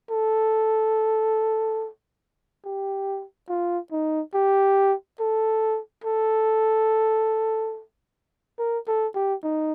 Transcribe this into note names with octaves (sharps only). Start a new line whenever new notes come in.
A4
G4
F4
D#4
G4
A4
A4
A#4
A4
G4
D#4